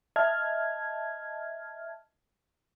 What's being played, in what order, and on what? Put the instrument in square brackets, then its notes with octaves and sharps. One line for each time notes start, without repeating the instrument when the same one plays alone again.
[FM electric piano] D#5 E5 A5 F6 G#6